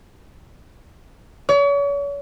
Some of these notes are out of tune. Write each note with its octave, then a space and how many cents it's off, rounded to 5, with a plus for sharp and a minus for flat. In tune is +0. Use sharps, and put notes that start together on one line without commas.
C#5 +40